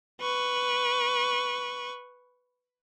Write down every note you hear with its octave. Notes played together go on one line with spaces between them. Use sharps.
B4 C#6